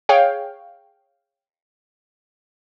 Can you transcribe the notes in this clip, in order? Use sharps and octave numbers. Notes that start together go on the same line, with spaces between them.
G#4 C#5 F5 G5